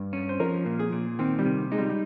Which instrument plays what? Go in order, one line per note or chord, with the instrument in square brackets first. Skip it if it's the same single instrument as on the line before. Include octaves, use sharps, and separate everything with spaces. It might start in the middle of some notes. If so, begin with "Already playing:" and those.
Already playing: [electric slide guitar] G2
C#4
[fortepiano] C5
[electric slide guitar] F3 [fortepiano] A#4
[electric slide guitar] A#2
[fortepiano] G#4
[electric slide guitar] A#2
[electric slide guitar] D#3 [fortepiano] C4
[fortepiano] G3
[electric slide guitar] C3
[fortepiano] G#3 [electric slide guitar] D#4
[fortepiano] G3
G3